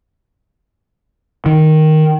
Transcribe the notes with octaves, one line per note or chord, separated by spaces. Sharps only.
D#3